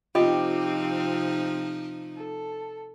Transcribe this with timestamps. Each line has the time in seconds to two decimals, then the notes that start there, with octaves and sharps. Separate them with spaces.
0.15 C3 F3 C4 D#4 F4 G4 D#5 D#6
2.16 A4